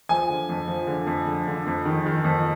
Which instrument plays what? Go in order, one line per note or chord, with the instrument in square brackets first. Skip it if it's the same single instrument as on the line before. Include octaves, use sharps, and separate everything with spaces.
[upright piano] F3 G#5
D3
F2
F3
D3
F2
D3
D3
F2
D#3
D#3
F2